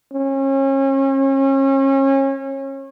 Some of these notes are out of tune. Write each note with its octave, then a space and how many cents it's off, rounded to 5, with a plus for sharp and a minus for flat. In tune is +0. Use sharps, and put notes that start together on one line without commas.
C#4 -35